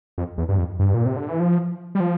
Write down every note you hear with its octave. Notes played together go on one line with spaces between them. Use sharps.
F2
E2
G2
F2
G2
A#2
C3
D3
E3
F3
G3
F3